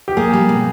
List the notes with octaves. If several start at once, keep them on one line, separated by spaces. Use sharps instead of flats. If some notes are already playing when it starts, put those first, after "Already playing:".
G4
A#3 G#4
G3
B2